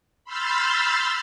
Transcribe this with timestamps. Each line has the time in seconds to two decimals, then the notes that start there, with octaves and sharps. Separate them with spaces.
0.24 B5 C6 E6 F6 G6 A6